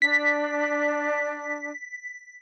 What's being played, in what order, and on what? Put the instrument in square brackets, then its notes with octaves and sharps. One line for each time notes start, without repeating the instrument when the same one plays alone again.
[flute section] D4 [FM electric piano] B6